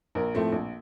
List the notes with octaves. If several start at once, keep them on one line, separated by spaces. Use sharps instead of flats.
A#1 A#4
A2 F3 A3 C4
A#1